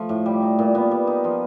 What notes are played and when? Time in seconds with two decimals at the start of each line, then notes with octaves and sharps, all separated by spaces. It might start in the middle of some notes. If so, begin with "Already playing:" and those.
Already playing: F3 A3
0.09 A2
0.26 G3
0.42 D#4
0.59 A#2
0.75 B3
0.91 G3
1.07 D#4
1.24 F3